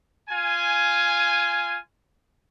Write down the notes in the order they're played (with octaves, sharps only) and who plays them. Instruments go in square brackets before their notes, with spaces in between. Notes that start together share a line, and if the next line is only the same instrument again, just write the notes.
[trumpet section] F4 G#5